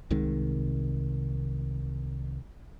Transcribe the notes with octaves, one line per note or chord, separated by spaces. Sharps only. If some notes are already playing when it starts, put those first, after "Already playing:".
C2 C3 D#3 G#3